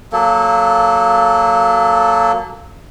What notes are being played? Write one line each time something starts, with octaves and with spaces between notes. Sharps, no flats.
F#3 A#3 A4